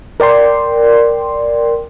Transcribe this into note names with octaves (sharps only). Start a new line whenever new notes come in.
A#4 D5 G5 C6